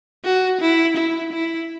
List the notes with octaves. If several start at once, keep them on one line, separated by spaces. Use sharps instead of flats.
F#4
E4
E4
E4